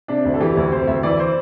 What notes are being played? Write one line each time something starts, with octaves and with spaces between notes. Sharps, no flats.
C3 D4
D2
A4
E3 G4
D2
C3 C5
D2 E5
E3 D5
C5